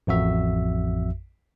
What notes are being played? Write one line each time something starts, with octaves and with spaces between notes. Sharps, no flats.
A1 F2 F#4 E5